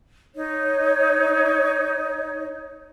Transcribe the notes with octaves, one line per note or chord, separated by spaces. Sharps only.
D#4 C#5